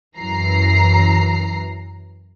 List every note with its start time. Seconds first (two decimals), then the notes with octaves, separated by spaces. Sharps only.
0.18 F#2 E3 A#5 C7